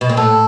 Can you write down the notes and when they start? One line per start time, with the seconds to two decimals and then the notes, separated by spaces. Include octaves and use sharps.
0.01 B2
0.09 A#2
0.17 A2 A4